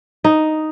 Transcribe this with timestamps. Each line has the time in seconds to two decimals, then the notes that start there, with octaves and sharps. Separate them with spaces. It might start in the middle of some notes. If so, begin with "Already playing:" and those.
0.24 D#4